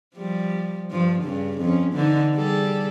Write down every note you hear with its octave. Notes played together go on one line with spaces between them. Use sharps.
F3 G3
G2 F3
G2 C#3
F2 C#4
D3 E3 D#4
G3 G#4 A4